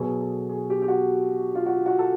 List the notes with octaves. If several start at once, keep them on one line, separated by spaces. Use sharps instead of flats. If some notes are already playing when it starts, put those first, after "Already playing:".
Already playing: B2 F#3 B3 G#4
A4
G#4
G4
G4
F#4
F4
F#4
F#4
A4